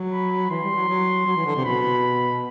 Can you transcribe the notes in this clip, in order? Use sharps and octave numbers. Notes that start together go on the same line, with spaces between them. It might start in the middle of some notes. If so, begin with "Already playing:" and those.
Already playing: F#3
B5
E3 C6
G3
F#3
F#3
F#3
E3
D3
C3
B2 B5